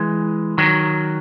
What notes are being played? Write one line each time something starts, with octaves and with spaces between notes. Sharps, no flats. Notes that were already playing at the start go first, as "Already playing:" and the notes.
Already playing: E3 G#3
D#3 F#3